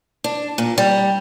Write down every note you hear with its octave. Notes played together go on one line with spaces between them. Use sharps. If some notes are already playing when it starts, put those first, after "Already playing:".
D4
A#2
G3